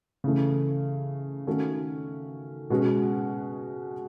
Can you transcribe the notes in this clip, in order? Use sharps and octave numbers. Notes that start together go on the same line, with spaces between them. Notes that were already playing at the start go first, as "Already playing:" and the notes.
C#3 E3 A3 C#4
D#3 A3 C#4 F#4 A4
B2 G#3 C#4 F#4